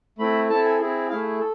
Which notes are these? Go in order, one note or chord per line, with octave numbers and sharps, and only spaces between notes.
A3 C4 E4 B5
C4 E4 A4 A5
G#5
C4 E4 G#4
A3 E4 G#4 F5
A4